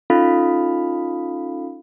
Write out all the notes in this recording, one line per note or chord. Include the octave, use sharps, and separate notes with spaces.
C#4 D#4 F4 A4 F5 B5